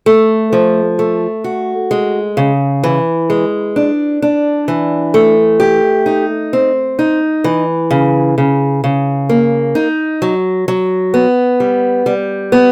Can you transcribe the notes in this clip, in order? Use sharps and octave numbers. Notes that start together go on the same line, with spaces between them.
A3
F3
A3
F#4
G#3
C#3
E3
G#3
D4
D4
E3
A3
G4
D#4
C4
D#4
E3
C#3
C#3
C#3
A#3
D#4
F#3
F#3
B3
G3
G3
B3